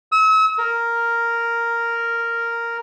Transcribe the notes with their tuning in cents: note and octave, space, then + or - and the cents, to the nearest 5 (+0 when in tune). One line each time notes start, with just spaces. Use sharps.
E6 -40
A#4 -5